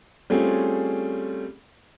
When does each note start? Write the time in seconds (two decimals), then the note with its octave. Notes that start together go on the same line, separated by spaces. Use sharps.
0.30 G3 A3 C4 C#4 F4 G#4